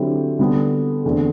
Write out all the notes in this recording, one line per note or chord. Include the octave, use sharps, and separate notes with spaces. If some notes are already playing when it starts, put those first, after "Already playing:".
Already playing: D3 F#3 C4 E4 G4
D3 G3 B3 D4
E2 D3 A3 C4